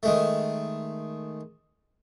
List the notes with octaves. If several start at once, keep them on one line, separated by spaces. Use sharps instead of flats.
D#3 G#3 A3